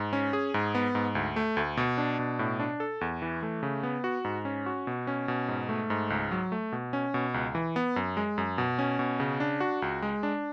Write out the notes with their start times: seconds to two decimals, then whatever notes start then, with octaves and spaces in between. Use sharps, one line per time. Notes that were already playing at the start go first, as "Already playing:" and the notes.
Already playing: G#2
0.13 C#4
0.33 G#4
0.54 G#2
0.75 B3
0.95 G#2
1.15 D2
1.36 A3
1.57 D2
1.77 B2
1.98 D4
2.19 B2
2.39 A2
2.60 D4
2.80 A4
3.01 E2
3.22 E3
3.43 A3
3.63 C#3
3.83 B3
4.04 F#4
4.25 G#2
4.45 C#4
4.66 F#4
4.87 B2
5.07 C#4
5.28 B2
5.48 G#2
5.69 A3
5.90 G#2
6.10 C#2
6.32 F#3
6.52 A3
6.72 B2
6.93 C#4
7.14 B2
7.34 C#2
7.55 E3
7.76 B3
7.96 F#2
8.17 G#3
8.38 F#2
8.58 B2
8.79 C#4
8.99 B2
9.20 C#3
9.40 D4
9.60 F#4
9.82 C#2
10.02 G#3
10.23 D4